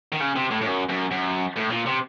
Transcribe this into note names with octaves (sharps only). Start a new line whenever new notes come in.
D#3
C#3
C3
A2
A2
F#2
F#2
F#2
A2
A#2
C3